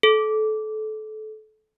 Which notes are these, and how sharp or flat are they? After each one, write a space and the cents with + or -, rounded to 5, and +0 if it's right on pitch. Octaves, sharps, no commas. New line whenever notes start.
A4 -25